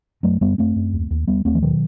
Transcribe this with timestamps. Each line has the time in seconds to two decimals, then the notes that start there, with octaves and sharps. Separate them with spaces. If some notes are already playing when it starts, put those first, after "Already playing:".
0.23 F#2 F#3 A3
0.41 F#2 G3 B3
0.58 F#2 A3 C4
0.76 F#2
0.93 D#2
1.11 D#2
1.27 D#2 G3 B3
1.45 D#2 A3 C4
1.55 E3
1.62 B2 D#3 F#3